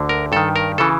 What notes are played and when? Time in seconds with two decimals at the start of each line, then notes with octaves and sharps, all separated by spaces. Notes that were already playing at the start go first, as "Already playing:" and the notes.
Already playing: D2 D3
0.09 A#4
0.32 G2 D#3 A4
0.56 A#4
0.78 C#3 E3 A4